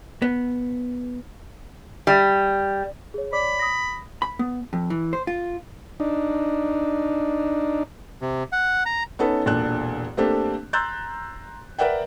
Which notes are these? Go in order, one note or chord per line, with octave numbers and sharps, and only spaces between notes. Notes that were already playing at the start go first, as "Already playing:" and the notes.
B3
G3
G#4 C#5
C#5 D5 B5 D6
D#6 A#6
B5
B3
F2
E3
C5
F4
D4 D#4
C3
F#5
A#5
B3 C#4 D#4 A4 B4
E1 A#2 D4 A4 F#6
A3 A#3 C4 D4 G4 A4
A#5 C6 E6 F#6 G6 A6
A#4 B4 D5 E5 F#5 G5